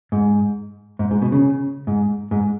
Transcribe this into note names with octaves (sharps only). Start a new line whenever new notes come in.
G#2
G#2
G#2
B2
C#3
G#2
G#2